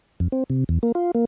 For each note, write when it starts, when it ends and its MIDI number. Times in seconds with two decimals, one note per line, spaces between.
0.20 0.28 41
0.32 0.44 60
0.50 0.64 48
0.69 0.79 40
0.83 0.92 58
0.95 1.11 65
1.15 1.25 58